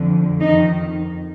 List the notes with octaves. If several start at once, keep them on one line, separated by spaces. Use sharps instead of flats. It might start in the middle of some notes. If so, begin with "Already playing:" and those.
Already playing: F2 D3
F2 D#3 D#4